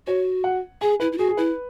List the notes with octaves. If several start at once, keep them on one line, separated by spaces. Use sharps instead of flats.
F#4 C#5
F#5
G#4 G#5
E4 B4
E4
F#4 G#4
G#4
E4 B4